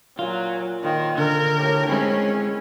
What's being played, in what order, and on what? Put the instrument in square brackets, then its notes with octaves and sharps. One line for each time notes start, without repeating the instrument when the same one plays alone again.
[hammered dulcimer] A#2 G#5 [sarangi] F#3 [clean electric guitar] F4
[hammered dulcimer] A#2 C5 [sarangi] D#3
[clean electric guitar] D3 [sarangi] A#4
[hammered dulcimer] A2 G4 C#5
[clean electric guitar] G#3 C4 [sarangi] C#4 [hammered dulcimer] E4 G#4 B5